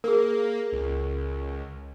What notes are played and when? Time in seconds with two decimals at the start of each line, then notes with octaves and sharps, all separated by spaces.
0.04 A#3 G#4 A#4
0.73 C#2